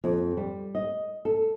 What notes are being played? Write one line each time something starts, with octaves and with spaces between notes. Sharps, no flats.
F2
G3
D#5
A4